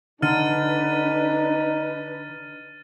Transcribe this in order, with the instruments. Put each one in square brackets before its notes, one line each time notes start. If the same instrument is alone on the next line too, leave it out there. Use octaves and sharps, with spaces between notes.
[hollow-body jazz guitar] D3 [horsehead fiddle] D4 B4 [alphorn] D#4 [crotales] F6 A6 D#7